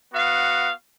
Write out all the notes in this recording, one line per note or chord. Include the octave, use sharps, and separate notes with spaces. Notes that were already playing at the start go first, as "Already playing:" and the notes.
B3 F#4 F5